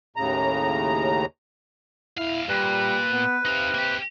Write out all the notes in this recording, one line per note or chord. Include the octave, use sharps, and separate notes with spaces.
D#2 A2 C#3 A#5
E2 E4 F5
A#2 G3 B4
B3
C3 D#4 F5
A#3 G4